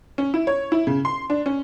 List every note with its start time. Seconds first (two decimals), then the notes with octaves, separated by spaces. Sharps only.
0.18 C#4
0.34 E4
0.47 C#5
0.72 E4
0.87 C#3
1.05 C6
1.30 D4
1.46 C#4